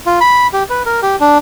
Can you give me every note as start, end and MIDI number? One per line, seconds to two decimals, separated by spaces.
0.06 0.19 65
0.21 0.47 83
0.53 0.63 67
0.70 0.82 71
0.86 1.01 70
1.03 1.16 67
1.20 1.38 62